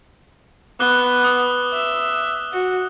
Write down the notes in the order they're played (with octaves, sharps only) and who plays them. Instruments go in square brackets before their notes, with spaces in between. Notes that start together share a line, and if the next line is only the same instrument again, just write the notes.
[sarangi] B3 [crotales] D6 F#6 G7
[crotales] D#6
[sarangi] E5
F#4